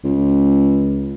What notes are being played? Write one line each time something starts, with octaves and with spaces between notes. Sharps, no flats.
C#2